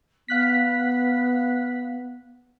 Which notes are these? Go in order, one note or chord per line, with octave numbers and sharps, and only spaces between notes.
B3 F5 F#6 B6